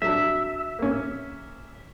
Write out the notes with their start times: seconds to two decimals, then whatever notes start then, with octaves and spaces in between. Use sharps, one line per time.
0.02 F#3 D4 E5
0.79 A#3 C#4